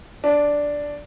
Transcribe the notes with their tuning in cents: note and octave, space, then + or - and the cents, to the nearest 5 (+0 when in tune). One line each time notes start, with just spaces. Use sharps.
D4 -5